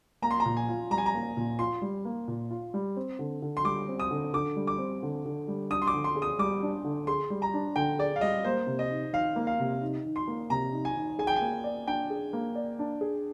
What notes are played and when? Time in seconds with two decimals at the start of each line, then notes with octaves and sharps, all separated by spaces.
0.22 A#3 A#5
0.31 C6
0.40 A#5
0.45 A#2
0.57 G#5
0.69 F4
0.91 G3 A#5
0.98 G#5
1.06 A#5
1.14 A#3
1.37 A#2
1.59 F4 C6
1.82 G3
2.05 A#3
2.28 A#2
2.51 F4
2.74 G3
2.97 C4
3.19 D3
3.42 D3
3.57 C6
3.64 G3 D6
3.88 C4
4.00 D#6
4.11 D3
4.33 D3 D6
4.56 G3
4.67 D6
4.79 C4
5.03 D3
5.25 D3
5.48 G3
5.70 D4 D#6
5.82 C6
5.87 D6
5.94 D3
6.04 C6
6.16 G#4
6.22 D#6
6.39 G3 D6
6.62 D4
6.84 D3
7.07 G#4 C6
7.30 G3
7.42 A#5
7.54 D4
7.76 D3 G5
7.99 G#4 D5
8.16 F5
8.21 G3 D#5
8.45 A#3 C5
8.67 C3
8.79 D#5
8.91 D#4
9.13 D#3 F5
9.36 A#3
9.47 F5
9.59 C3
9.81 D#4
10.05 D#3
10.16 C6
10.28 A#3
10.50 C3 A#5
10.72 D#4
10.85 G#5
10.96 D#3
11.19 G#4 G#5
11.27 G5
11.36 A#3 G#5
11.64 D5
11.87 D4 G5
12.10 G#4
12.33 A#3
12.55 D5
12.79 D4
13.01 G#4